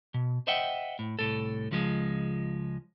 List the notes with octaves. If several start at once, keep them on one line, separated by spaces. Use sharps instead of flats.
B2
C5 D#5 E5 F#5 G5
A2
C2 A2 A4
C#2 F3 G#3